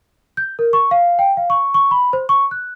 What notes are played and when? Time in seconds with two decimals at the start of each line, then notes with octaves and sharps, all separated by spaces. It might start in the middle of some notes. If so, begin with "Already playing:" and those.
0.37 G6
0.59 A#4
0.73 C#6
0.91 F5
1.19 G5
1.37 F5
1.50 C#6
1.74 C#6
1.91 B5
2.13 C5
2.29 C#6
2.51 F#6